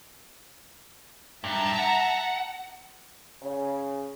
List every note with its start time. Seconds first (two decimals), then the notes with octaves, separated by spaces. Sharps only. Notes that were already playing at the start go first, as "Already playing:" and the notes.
1.44 G2 E5 A5 A#5
1.79 F#5
3.42 C#3